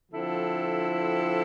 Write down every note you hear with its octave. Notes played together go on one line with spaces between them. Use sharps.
D3 F3 C4 E4 A4